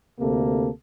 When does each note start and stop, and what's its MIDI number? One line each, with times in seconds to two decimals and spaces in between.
0.20 0.69 38
0.20 0.69 48
0.20 0.69 58
0.20 0.69 69